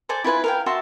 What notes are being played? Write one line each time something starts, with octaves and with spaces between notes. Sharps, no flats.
A4 C5 D5 G#5
E4 F4 B4 G#5
A#4 F5 G5
F#4 E5 A5 C6